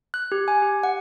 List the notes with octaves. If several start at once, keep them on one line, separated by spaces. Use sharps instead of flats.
F#6
G4
G#5
G4
F#5